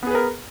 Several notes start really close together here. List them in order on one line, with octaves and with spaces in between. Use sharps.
B3 G#4 B4 A#4